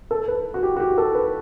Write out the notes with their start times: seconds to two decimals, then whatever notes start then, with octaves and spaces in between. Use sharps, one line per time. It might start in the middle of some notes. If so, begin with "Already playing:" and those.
0.11 A4
0.28 B4
0.54 F#4
0.63 G4
0.76 F#4
0.80 G4
0.98 A4
1.15 B4